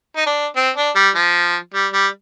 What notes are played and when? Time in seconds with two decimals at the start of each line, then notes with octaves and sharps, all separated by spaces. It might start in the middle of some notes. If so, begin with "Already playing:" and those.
0.16 D#4
0.26 D4
0.56 C4
0.76 D4
0.95 G3
1.15 F3
1.74 G3
1.93 G3